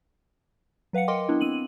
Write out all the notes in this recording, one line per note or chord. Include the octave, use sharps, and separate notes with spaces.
F#3 B4 F5 F#5 C#7
A#4 D#5 G5 C6 D6
B3 D4 E4
C4 D#7 F#7